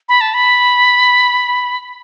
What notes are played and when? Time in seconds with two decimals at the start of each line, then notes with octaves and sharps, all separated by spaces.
0.09 B5
0.21 A5
0.34 B5